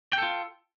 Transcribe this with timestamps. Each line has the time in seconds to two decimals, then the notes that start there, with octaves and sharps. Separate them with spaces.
0.13 G5
0.18 A4
0.23 F4